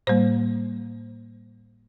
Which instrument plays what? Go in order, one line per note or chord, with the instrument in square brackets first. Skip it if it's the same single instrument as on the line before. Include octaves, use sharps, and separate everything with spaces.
[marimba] A2 G3 A#3 C5